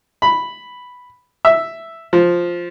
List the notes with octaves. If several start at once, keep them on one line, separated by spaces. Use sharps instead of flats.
B5
E5
F3